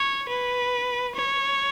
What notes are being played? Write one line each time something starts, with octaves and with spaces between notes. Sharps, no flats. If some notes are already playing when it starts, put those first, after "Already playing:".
Already playing: C#5
B4
C#5